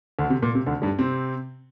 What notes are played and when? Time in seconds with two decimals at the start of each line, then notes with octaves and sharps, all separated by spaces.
0.19 D2 D3
0.30 C3
0.42 A#2
0.55 C3
0.66 D2 D3
0.82 G2 G3
0.99 C3 C4